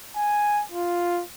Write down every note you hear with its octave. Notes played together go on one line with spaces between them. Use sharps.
G#5
F4